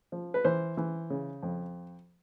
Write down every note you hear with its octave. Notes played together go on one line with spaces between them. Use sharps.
F3
B4
E3 C5
E3
C#3
F2